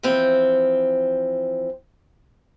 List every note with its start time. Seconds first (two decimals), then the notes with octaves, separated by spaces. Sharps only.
0.03 E3 F3 C4